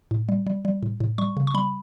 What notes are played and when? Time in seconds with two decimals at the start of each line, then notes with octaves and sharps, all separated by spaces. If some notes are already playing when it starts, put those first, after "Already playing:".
0.11 A2
0.29 G3
0.47 G3
0.65 G3
0.83 A2
1.00 A2
1.18 G3 C#6
1.37 C#3
1.47 C#6
1.54 G3 B5